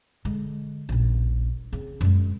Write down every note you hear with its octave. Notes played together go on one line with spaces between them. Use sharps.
D3 G#3
D#1 A#1
C#3 C4
F#2 G#3